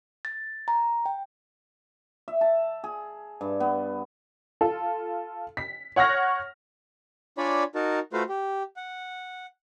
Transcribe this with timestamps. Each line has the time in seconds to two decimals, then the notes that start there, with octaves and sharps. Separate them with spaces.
0.25 A6
0.68 A#5
1.06 G5
2.28 E5
2.41 A5
2.84 G#4
3.41 G2
3.60 B3
4.61 F4 A4
5.57 B6
5.96 C#5 F#5 C#6 F6 A#6
7.38 D4 F4 C#5 D5 G#5 B5
7.75 D#4 F#4 A#4 A5
8.13 A3 F4 F#4 B4 C5 F5
8.29 G4
8.76 F#5